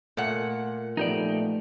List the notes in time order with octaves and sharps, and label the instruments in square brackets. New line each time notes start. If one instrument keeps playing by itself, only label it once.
[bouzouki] A#2 F#5 [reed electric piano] A3
[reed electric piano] F3 B3 [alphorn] A3 [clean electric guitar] D#4 G4 D5